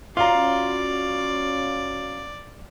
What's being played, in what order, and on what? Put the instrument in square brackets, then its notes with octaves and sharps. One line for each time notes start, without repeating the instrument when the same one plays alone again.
[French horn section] C#4 F#4 [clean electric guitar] F4 [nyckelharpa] D5 [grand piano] F5 A#5